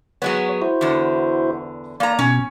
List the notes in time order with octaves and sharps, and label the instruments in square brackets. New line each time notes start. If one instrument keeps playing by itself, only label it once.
[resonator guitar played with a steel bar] F#3 G#3 B3 [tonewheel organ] C#5
[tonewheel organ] E4 F#4 C5
[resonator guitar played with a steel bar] E2 D3
[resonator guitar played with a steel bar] A#3 A#5 [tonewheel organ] D5
[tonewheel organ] B2 [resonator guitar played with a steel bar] C#4